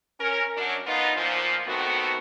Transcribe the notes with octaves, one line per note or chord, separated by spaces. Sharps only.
C#4 A#4
F#2 F#3 D4
B3 D#4 F4
A#2 F3
D#3 A3 B3 C4 F#4